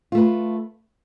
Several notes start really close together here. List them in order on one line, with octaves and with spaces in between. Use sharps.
F4 A3 B4